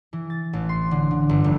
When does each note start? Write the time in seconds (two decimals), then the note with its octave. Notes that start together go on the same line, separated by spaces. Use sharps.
0.13 E3
0.30 A6
0.53 A1
0.69 C6
0.91 D3
1.11 D3
1.29 G1
1.44 F1